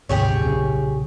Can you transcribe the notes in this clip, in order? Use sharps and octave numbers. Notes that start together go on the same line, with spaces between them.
G#1 D2 C3 G4 G#4 C#5
B1 A#2 C#3